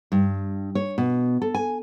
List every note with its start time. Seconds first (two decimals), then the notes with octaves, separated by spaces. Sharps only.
0.12 G2
0.75 C#5
0.98 B2
1.42 A4
1.55 G#5